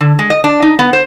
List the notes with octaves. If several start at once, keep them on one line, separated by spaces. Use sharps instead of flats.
D3
G#3
D#5
D4
D#4
B3
C5